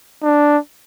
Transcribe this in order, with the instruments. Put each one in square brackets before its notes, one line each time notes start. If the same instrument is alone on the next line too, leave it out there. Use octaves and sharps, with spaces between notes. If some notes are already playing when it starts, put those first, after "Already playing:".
[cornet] D4